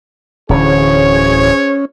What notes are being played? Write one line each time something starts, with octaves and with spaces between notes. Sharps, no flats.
D1 D3 E3 C#4 G#4 C5 C#5